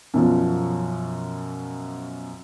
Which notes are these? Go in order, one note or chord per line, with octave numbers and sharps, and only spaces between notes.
F#2 B2 F3